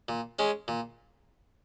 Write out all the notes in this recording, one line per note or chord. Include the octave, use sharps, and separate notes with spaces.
A#2
G#3 C#4
A#2